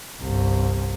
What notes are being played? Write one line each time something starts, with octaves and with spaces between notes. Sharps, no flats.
G1 C2